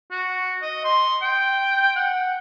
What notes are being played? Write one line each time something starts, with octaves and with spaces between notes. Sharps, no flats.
F#4
D#5
C6
G5
F#5